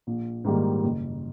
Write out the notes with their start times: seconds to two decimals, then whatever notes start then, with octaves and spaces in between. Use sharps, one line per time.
0.07 A#1
0.45 G#2 D#3 G3 A#3
0.83 F#1